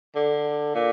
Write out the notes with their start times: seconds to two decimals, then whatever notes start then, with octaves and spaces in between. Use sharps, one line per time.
0.16 D3
0.75 A#2